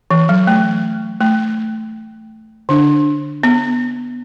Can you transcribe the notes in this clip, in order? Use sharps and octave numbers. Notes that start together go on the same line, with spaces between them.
E3
F#3
A3
A3
D3 D4
B3